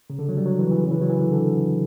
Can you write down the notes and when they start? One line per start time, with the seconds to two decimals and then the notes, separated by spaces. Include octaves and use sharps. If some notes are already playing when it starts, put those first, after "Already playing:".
0.10 C#3
0.19 D3
0.29 F#3
0.37 G3
0.46 F#3
0.59 E3
0.71 E3
0.83 C#3
0.91 E3
1.01 F#3
1.10 E3
1.19 D3
1.32 D3